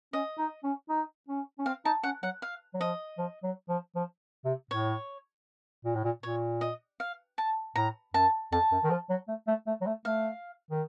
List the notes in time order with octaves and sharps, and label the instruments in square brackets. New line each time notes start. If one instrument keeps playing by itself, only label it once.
[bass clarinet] C#4 [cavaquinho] D#5
[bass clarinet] D#4
C#4
D#4
C#4
C#4
[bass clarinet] C4 [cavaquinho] F5
[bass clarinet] D#4 [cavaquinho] A5
[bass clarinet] C#4 [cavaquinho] F#5
[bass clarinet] F#3 [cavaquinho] F#5
[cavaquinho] F5
[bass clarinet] F#3
[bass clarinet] F3 [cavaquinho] D#5
[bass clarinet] F3
F#3
F3
F3
C3
[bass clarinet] A2 [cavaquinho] C#5
[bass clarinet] A#2
A2
A#2
[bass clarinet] A#2 [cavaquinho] C#5
[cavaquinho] D#5
F5
A5
[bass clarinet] A2 [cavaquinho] A#5
[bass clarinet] F#2 [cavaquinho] A5
[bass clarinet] F2 [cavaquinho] A5
[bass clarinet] F#2
D#3
F3
F#3
A3
A3
A3
F#3
A3
[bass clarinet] A3 [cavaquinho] F5
[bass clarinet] D#3